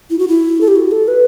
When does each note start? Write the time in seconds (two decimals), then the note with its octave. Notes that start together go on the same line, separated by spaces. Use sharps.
0.10 E4
0.19 F#4
0.28 E4
0.61 A4
0.68 G4
0.76 F#4
0.91 A4
1.08 B4